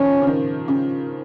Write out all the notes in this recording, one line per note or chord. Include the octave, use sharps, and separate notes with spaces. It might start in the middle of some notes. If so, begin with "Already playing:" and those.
Already playing: D#3 F3 C#4
C#3
D#3
C#3